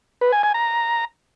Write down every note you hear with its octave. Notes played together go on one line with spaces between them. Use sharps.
B4
G#5
G#5
A#5